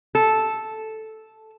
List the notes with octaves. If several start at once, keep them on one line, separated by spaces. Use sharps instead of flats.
A4